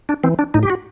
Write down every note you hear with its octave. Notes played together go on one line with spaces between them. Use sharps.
D4
E3 C4
D4
A2 D#4
G4
F#4